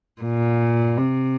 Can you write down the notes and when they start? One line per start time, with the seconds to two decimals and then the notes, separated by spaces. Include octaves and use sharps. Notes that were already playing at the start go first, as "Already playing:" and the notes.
0.22 A#2
0.98 C3